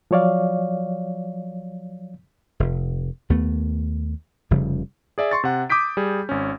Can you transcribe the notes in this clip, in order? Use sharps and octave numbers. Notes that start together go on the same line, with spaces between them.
F3 F#3 C#5 D5 F5
F1
D#2 A3 B3
F1 C#3 F3 G3
G#4 D5 E5 G#5
C6 C#6 A6
C3 F#5
D6 D#6 G6 B6 D7
G3 G#4
G#1 C#4